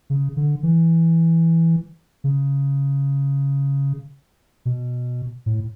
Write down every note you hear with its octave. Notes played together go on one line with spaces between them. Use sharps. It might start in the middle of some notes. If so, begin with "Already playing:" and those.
C#3
D3
E3
C#3
B2
A2